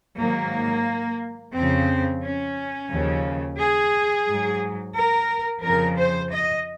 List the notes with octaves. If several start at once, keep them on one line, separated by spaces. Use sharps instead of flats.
G#2 D#3 F#3 A#3
F2 C#3 F3 C4
C#4
D#2 C#3 F3
G#4
G#2 F#3
A#4
F2 C#3 F3 A#4
C5
D#5